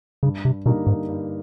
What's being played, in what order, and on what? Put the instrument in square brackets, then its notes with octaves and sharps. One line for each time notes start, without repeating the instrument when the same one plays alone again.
[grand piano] G2 [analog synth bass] C#3
[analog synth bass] C3
[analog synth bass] B2 [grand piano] D3 G3 A#3 D#4
[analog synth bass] G#2
[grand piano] G2